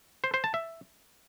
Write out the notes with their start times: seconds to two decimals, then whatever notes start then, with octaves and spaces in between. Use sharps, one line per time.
0.24 C5
0.34 C5
0.44 A5
0.54 E5